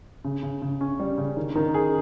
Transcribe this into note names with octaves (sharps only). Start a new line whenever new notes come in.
C#3
C#3
C#3
C#4
G3
C#3
D#3
D#3
G#4